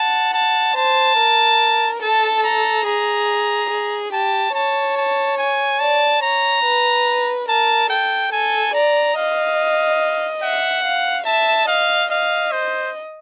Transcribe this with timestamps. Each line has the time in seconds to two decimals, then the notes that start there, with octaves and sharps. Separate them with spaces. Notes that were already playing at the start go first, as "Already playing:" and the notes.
Already playing: F#5 A5
0.34 A5
0.76 C5 A5
1.18 A#4
2.02 A4 A5
2.44 A#5
2.86 G#4 A#5
3.70 G#4
4.13 G4 A5
4.54 C#5 A5
4.97 A5
5.38 G#5
5.80 D5 A5
6.22 C#5 A#5
6.64 B4
7.48 A#4 A5
7.90 A4 G5
8.32 A4 G#5
8.74 D5 A#5
9.17 D#5 F5
10.43 E5 F#5
10.84 F5
11.26 E5 A5
11.68 D#5 F5
12.10 D#5 F5
12.52 C5